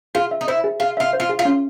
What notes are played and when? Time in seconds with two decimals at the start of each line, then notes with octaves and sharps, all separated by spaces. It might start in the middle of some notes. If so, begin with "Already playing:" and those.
0.15 F4 G#4
0.31 E5
0.41 D#4
0.48 E4 C5
0.64 G#4
0.80 F4 G#4
0.97 F4 E5
1.13 C5
1.20 F4
1.29 G#4
1.39 F4
1.45 C#4